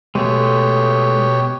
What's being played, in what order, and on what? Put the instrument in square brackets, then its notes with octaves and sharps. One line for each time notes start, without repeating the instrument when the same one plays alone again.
[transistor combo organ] B2 G4 C#5 [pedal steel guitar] G#3 A3